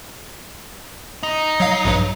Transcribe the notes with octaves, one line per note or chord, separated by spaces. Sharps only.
D#4
F#3 F5
A#1 G2 F#3